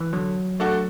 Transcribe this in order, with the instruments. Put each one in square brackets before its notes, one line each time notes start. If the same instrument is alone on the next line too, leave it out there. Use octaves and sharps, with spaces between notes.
[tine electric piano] E3
[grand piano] D3 [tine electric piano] F#3
[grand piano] A3 D4 F#4 A4